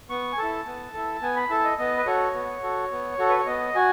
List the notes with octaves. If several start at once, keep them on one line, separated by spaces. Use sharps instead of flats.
B3 C#6
G#5
E4 A4 A5
B3
E4 A4
B3 G#5
B5
E4 A4 A5
D#5
B3 D#5
B4
F#4 A4 C#5
B3
F#4 A4
B3
F#4 A4
B4
C#5
B3 D#5
F#4 G#5